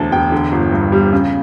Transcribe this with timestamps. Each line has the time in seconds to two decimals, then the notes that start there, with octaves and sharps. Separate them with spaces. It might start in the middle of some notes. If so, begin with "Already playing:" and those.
Already playing: E1 D2 D3 A5
0.12 E1 G5
0.32 D3
0.52 G1
0.72 G2
0.92 G3
1.13 C#3